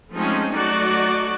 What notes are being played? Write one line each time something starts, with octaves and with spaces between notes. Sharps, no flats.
F3 G#3 A3 C4 C#4 D#4
F#3 A3 D#4 F#4 D5